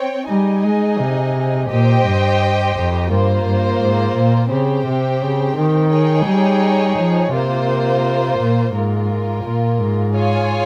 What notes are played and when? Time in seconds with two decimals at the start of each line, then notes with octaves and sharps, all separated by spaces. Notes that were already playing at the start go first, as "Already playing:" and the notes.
Already playing: C4 C#5 G5
0.29 G3 D#4 G#4 D#5 G#5
0.64 G#3
0.99 C3
1.69 A#2 G4 C5 D#5 G5
2.04 G2
2.75 F2
3.09 G2 A#3 F4 C5
3.45 G2
3.80 G#2
4.15 A#2
4.50 C#3 C4 G4 C5 G5
4.86 C3
5.21 C#3
5.56 D#3
5.91 D#4 G#4 C#5 G5
6.26 G3
6.97 F3
7.32 C3 A#3 F4 C5
8.38 A#2
8.72 G#2 A#3 F4 A#4
9.43 A#2
9.78 G#2
10.13 F4 G#4 C#5 F5 G#5